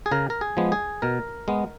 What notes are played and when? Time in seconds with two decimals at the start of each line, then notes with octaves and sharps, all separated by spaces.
0.06 G#4
0.12 C#3 A#4
0.30 A#4
0.41 G#4
0.57 F3 G#3 B3
0.72 G#4
1.02 B2 A#4
1.48 G#3 B3